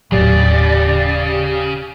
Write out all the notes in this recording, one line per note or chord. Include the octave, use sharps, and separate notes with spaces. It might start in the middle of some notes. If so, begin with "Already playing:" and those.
D#1 A2 C#3 F#3 G4 D5